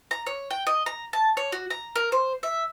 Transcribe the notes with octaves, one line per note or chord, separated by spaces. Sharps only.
A#5
C#5
G5
D#5
A#5
A5
C#5
F#4
A#5
A#4
C5
E5